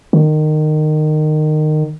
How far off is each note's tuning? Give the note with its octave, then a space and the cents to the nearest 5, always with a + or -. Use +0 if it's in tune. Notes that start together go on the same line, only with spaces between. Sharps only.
D#3 -20